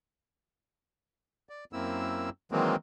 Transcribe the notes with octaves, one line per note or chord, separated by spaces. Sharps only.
D5
F#2 A#3 C4 E4 E6
D#3 E3 F#3 G#3 A#3 C4